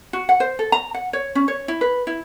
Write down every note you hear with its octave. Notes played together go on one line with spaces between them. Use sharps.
F#4
F#5
C5
A4
A#5
F#5
C#5
C#4
C#5
E4
B4
E4